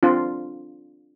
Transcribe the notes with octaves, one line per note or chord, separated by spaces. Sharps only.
C4 D4 F4